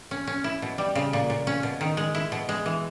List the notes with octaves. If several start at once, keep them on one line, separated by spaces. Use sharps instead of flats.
C#4
C#4
E4
B2
G3
C#3
A#2
A#2
C#4
B2
D#3
G#3
E4
B2
G#3
E3